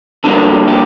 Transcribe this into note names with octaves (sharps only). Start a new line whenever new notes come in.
F2 D3 G3 A#3 A4
G4